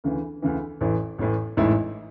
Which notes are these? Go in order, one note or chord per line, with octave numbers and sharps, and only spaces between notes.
D2 C#3 E3
D2 C#3 E3
A1 A2 E3
A1 A2 E3
A1 G#2 E3 A3 E4